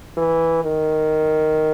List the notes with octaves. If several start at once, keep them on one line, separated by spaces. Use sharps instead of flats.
E3
D#3